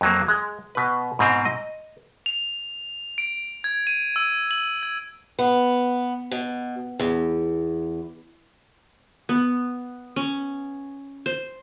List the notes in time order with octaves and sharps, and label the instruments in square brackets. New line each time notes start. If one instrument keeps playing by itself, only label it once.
[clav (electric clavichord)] F2 F#3 A#3
G#3
B2 B4
G#2 B2 C4
D#5
[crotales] F7
D7
G#6
D#7
E6
F#7
G#6
[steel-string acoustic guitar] B3
B2
E2
[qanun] B3
C#4
C5